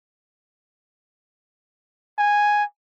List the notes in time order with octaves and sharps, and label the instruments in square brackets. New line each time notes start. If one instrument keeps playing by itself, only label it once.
[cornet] G#5